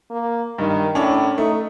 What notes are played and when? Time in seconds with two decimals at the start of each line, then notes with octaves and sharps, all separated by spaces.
0.11 A#3
0.58 G2 D#3
0.95 A2 C#4 D4
1.38 A3 D#4